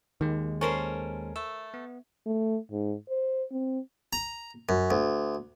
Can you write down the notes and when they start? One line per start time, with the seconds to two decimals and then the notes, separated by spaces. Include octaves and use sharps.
0.21 D#2 D#3 G#3
0.61 C#4 A4 A#4 C5
1.36 A3 E6
1.74 B3
2.26 A3
2.71 G#2
3.09 C5
3.51 C4
4.13 A#5
4.69 F#2
4.91 D2